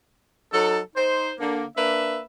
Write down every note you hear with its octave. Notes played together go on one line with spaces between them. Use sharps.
F#3 D#4 A4
D#4 C5
D3 A#3
A#3 D4 B4 E5